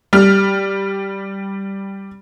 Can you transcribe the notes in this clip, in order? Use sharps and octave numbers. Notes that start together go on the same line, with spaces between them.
G3 F6